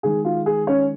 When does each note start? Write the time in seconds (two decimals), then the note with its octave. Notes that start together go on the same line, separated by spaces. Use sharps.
0.03 D#3 G#3 G#4
0.25 F4
0.46 G#4
0.67 C#4 C#5